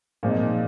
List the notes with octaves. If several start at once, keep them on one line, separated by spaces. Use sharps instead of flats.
A#2 F3 G#3 C4 D#4